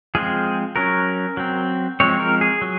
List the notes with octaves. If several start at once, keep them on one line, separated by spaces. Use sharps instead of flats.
F3 G#3 C4 G#4
F#3 C#4 A#4
F#3 C4
F3 G#3 C4 C#5
A#4
G#4
F#3